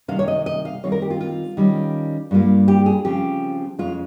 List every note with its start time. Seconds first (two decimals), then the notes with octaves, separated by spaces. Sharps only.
0.08 C3 D#3 G3 F5
0.19 C#5
0.28 D#5
0.46 D#5
0.65 F5
0.83 D#3 G3 C4 F4 C#5
0.92 A#4
1.02 G4
1.10 F4
1.21 F4
1.57 D#3 G3 C#4 F4
2.31 G2 G3 A#3 F4
2.68 G4
2.86 G#4
3.05 C#3 F3 C4 F4 G4
3.78 F2 C#3 G#3 F4